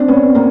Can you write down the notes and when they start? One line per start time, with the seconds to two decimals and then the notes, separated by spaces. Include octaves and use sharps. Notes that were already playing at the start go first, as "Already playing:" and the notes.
Already playing: C4 D4
0.08 B3 C#4
0.35 A#3 C4